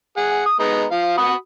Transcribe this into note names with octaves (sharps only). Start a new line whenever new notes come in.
G#4 F#5
D#6
G#3 B3 D#4
F3 F5
F#4 B5 D#6